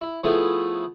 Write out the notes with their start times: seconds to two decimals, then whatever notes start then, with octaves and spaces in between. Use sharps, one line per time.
0.01 E4
0.24 F3 A3 B3 E4 G#4